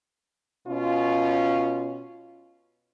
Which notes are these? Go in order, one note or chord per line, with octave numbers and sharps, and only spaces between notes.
B2 C#4 F4